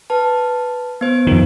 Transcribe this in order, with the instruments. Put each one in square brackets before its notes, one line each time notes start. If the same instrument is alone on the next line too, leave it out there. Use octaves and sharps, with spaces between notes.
[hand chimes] B4 A5
B3 C5
[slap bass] F2 D#3